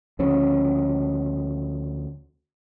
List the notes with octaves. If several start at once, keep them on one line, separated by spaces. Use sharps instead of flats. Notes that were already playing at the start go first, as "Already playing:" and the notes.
D2 C#3 F3 C#4